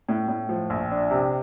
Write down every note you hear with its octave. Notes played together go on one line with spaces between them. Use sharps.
A2
A2
F3
A#1
D4
C3